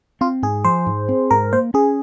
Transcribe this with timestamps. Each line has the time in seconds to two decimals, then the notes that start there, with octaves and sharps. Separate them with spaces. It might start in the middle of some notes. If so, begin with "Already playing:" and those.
0.21 C4 F4
0.43 G#2 G#4
0.64 F3 C5
0.86 G#2
1.09 C4
1.31 G#2 A#4
1.52 A#3 C5
1.74 C#4 G#4